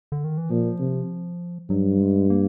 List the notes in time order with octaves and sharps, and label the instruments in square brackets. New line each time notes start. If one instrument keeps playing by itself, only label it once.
[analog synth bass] D3
D#3
E3
[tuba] A#2 [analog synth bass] F3
[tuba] C3
[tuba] G2 [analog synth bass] F#3
[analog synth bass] G#3
A#3